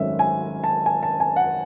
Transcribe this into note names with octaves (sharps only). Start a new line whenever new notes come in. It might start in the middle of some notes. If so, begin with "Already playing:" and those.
Already playing: G#1 F#2 D#3 A3 C#4 E5
G#5
A5
G#5
A5
G#5
F#5